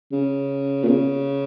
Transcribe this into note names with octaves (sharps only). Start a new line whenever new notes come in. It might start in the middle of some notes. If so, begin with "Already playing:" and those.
C#3
A#2
C#3